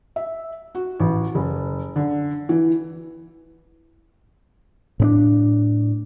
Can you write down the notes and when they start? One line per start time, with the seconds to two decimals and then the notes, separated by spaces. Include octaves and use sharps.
0.16 E5
0.75 F#4
1.00 A1
1.35 F#1
1.96 D3
2.49 E3
5.00 A2 C4 D4